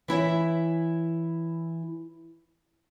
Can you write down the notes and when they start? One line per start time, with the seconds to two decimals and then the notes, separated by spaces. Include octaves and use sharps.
0.08 E3 E4 C#5 E5